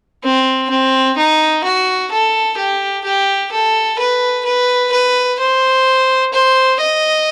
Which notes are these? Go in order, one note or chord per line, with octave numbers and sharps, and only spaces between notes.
C4
C4
D#4
F#4
A4
G4
G4
A4
B4
B4
B4
C5
C5
D#5